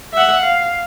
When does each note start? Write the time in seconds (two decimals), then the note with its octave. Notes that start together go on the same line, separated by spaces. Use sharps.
0.13 E5 F#5
0.43 F5